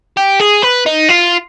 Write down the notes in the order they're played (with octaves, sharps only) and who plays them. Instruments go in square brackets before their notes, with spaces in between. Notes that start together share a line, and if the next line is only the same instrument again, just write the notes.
[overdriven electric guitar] G4
G#4
B4
D#4
F4